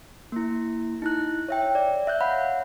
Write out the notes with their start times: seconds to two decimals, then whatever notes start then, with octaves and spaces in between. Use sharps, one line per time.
0.32 A#3 E4
1.02 D#4 E4 F#6
1.49 C#5 E5 G5
1.75 D5
2.07 E5 F#6 G6
2.20 C#5 F5 F#5 B5